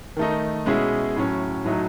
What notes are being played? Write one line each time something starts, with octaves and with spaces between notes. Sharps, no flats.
D#3 A3 D#4
B2 G#3 C#4 E4 G#4
A2 F#3 C#4
A2 F#3 A3 D#4